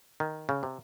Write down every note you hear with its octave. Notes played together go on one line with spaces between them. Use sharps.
D#3
C#3
C3